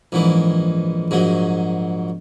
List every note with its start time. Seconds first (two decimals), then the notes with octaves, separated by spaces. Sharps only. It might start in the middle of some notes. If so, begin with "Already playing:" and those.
0.12 A#1 G#2 E3
1.11 A#1 G#2 F#3